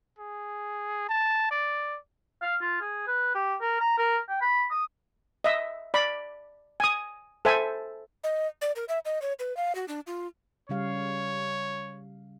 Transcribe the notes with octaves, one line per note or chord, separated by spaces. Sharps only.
G#4
A5
D5
F5
F4
G#4
B4
G4
A#4
A#5
A#4
G5
B5
D#6
D#5 E5
D5 B5
G#5 D#6
A4 C5 E5 G#5
D#5
D5
A#4
E5
D#5
C#5
B4
F5
F#4
D4
F4
C#3 G3 C#5 F5